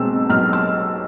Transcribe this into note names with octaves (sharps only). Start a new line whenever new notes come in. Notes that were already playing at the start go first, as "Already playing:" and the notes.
Already playing: B1 B2 G#3 C4 E6
B1 F6
E6